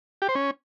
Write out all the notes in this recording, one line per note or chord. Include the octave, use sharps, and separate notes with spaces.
G4
C5
C#4